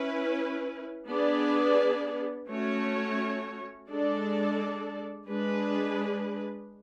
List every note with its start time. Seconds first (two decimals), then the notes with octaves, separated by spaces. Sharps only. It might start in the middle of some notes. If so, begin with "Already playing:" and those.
Already playing: C#4 E4 B4
1.09 B3 D4 G#4 B4 D5
2.49 A3 C#4 F#4 C#5
3.89 G#3 D4 A4 D5
5.29 G#3 D4 G#4 B4